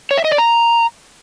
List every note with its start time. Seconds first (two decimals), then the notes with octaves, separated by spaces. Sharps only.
0.11 C#5
0.18 E5
0.25 D#5
0.31 D5
0.38 A#5